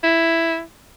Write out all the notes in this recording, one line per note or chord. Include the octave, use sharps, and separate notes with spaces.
E4